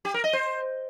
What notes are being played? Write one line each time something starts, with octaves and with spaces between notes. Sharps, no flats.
G4
A#4
D#5
C5